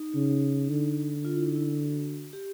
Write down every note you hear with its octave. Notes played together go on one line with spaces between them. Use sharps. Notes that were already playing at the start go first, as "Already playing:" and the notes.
Already playing: D#4
C#3
D3
F4
E4
D#4
E4
F#4
G4